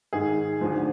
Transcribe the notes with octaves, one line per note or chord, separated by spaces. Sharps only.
G#2 D#3 G#4
D2 D3 F3